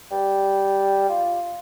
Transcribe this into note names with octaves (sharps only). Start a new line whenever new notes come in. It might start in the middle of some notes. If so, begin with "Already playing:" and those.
G3
F4